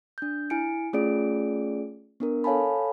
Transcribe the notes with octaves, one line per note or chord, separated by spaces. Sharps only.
D4 G6
E4 G#5 C#7 D7
A3 C#4 F4 G#4 D5 D7
B3 D4 A#4
A4 C#5 F5 G#5 A5 B5